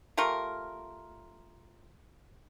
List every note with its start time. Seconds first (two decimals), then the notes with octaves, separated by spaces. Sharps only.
0.17 A3 F4 G4 A#4